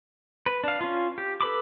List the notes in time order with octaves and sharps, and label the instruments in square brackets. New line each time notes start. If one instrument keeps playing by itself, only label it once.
[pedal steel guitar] B4
D4 F5
C#4 F4
G4
A4 B4 B5 D6